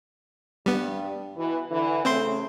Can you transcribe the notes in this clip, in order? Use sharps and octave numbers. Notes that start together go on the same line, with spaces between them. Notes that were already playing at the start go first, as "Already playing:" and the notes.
G2 G3 B3
B2 E3
D3 E3
C#3 A3 C4 C5 C6